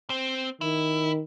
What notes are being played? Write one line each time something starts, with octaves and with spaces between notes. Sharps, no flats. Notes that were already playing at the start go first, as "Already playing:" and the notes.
C4
D#3 E4